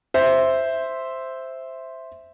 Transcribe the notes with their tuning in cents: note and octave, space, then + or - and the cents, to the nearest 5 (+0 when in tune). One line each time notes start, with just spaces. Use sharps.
C5 +0 E5 +0